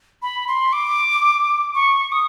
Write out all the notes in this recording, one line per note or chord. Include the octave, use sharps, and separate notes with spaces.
B5
C6
D6
C#6
D#6